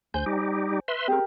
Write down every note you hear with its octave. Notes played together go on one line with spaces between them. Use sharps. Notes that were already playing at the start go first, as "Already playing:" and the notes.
D2 C5 G#5 G6
G3 D#4 G4
B4 E5 C6
C4 G4 G#4 A#4